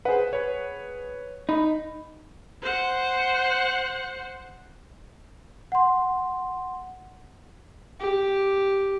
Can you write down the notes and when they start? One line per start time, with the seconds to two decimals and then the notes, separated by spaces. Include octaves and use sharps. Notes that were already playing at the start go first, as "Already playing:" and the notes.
0.05 G#4 B4 C5 F#5
0.33 B4 C#5
1.49 D#4 B5
2.63 C5 F#5
5.72 F#5 C6
8.00 G4